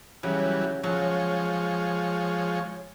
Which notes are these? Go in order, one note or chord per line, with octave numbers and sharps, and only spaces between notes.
C#3 E3 F#3 G3
F3 F#3 G#3 C#5